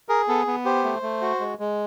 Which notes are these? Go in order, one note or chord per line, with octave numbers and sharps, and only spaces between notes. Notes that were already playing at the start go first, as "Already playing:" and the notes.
G#4 A#4
B3 A4
B3
G4 C5
A3
A3
F#4
G#3
G#3